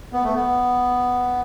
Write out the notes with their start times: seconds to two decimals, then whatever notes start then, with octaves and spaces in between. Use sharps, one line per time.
0.13 B3
0.23 A3
0.35 B3